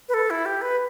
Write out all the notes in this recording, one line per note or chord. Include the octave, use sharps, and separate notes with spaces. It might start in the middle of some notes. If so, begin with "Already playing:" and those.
B4
A4
E4
G4
B4